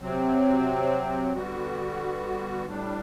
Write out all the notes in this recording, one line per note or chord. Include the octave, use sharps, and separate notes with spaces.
C3 F#3 C4
D3 G3 B3 F#4
A2 G3 D4